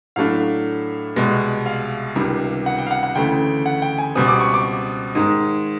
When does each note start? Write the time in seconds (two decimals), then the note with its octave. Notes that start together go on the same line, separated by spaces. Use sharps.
0.16 A2 F#3 A3 D4 F5
1.16 C2 B2 G#3
1.66 F5
2.16 C#2 C3 D#3 G3
2.66 F#5
2.78 G5
2.87 F5
2.91 F#5
3.03 F#5
3.15 D2 C#3 E3 A3 G5
3.66 F#5
3.82 G5
3.98 G#5
4.15 C#2 B2 G3 C4 D#6
4.28 D6
4.41 C#6
4.54 D6
5.15 G#2 D#3 G#3 D#6